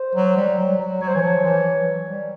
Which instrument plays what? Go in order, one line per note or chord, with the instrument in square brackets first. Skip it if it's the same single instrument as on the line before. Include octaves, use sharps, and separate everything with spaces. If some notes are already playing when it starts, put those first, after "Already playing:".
Already playing: [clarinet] C5
[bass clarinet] F#3
G3
F#3
F#3
[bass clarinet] F#3 [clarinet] C#5
[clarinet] C5
[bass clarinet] E3 [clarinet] C#5
[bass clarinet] F3
E3
F#3
G3